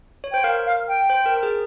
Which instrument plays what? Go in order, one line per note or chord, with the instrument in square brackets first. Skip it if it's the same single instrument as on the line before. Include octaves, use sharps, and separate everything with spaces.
[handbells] C#5
[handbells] C5 [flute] G5
[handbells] A#4 [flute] F5
[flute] F5
G5
[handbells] C5
A#4
A#4
G#4